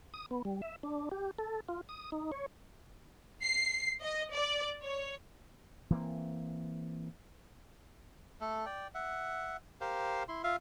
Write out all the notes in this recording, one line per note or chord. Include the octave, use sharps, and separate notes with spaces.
D#6
B3
G3
E5
D4
G4
A4
F4
D#6
D#4
C#5
C7
D#5
D5
C#5
E3 A#3 C4
A3 A4
D5 G5
E5 F#5
G4 A#4 C5 F5
E4 C6
F4 E5 F5